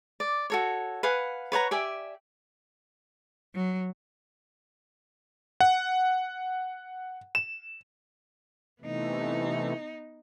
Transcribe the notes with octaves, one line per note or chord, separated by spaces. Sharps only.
D5
F#4 A4 C#5
B4 F5 F#5 G#5
B4 C#5 F#5 A#5
G4 D5 E5 G#5
F#3
F#5
E7
C3 E3 A3 B3 D#4